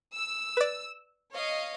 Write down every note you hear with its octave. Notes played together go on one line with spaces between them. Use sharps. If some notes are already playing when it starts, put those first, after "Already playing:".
E6
B4 D5
C#5 D#5 F5